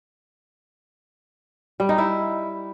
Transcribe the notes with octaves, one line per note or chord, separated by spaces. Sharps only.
G3
D#4
E4